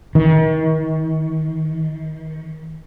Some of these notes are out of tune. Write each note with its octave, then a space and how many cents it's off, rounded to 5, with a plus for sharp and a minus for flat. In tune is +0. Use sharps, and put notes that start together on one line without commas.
D#3 +35